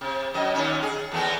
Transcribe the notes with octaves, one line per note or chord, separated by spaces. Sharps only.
C3
F#2 D#5
D#2 A#2 C#4
G#4
E2 A3 B3